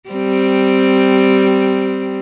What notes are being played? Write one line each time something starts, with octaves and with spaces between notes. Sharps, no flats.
G3 C4